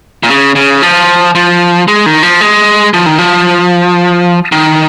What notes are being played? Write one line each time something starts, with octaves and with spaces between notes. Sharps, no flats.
A#2
C#3
C#3
F3
F3
G#3
D#3
F3
G#3
F3
D#3
F3
D#3